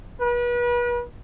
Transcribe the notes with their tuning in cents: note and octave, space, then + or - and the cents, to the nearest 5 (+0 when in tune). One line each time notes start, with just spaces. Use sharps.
B4 -35